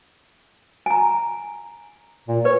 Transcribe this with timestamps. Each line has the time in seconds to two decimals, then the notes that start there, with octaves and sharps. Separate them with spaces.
0.86 G#5 A#5
2.28 A#2
2.45 B4 C#5